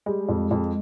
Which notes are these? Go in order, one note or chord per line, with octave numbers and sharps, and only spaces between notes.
G3 G#3
F2
F2